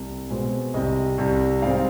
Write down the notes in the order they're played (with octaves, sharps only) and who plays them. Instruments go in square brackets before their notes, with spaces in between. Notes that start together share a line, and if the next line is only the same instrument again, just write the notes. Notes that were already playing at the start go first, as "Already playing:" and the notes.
Already playing: [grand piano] C2 C3 G3
B2 G#3 C4
C2 C3 G3 D#5
C2 C3 G3
G#2 G3 C4 D5 F5